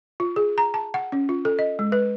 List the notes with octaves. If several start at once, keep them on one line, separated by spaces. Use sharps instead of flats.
F4
G#4
A#5
A5
F#5
C#4
F4
A4
D#5
G#3
B4